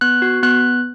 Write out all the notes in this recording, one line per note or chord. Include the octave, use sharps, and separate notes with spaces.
B3 F#6
F#4
B3 F#6